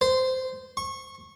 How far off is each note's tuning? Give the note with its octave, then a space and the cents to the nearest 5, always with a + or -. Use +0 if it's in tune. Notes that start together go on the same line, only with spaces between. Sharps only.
C5 -15
C#6 -25